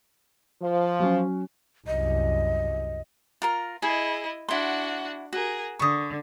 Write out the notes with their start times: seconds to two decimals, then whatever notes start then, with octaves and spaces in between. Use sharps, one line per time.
0.61 F3
1.00 F#3 C#4
1.87 C2 F#2 D#5
3.42 F4 A#4 A#5
3.82 E4 G#4 D#5
4.49 D4 E4 F#4 F#5 C6
5.33 F#4 G#4 A#4
5.79 D3 C#6 D#6